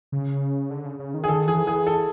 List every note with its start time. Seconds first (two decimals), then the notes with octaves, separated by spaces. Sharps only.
0.12 C#3
0.70 D3
0.85 C#3
0.99 C#3
1.14 D#3
1.24 G#4
1.28 D#3 A4
1.48 E3 G#4
1.67 E3 G#4
1.87 A4